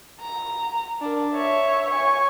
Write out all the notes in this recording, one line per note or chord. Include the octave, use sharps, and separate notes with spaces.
A#5
D4 A#4
C#5 E5
C#5 G#5